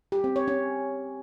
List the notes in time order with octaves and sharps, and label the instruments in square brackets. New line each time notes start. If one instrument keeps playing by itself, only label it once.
[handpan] G4
C4
C#5
C#4